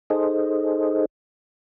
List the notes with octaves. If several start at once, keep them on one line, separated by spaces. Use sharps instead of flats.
D#4 G#4 A4 C5 D#5